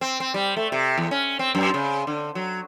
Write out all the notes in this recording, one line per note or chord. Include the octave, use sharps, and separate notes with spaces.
C4
C4
G3
A3
C3
E2
C#4
C4
F#2
C#3
D3
F#3